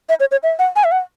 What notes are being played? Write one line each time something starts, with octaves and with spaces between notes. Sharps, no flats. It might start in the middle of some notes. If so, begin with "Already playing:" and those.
E5
C#5
C#5
E5
F#5
G#5
E5
F#5